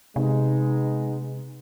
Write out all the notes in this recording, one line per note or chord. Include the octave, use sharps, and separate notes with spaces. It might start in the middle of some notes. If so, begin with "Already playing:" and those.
C3 G#3 B3 D#4